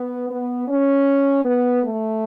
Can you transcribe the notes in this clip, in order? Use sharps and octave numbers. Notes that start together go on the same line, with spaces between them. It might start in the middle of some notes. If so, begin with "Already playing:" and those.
Already playing: B3
B3
C#4
B3
A3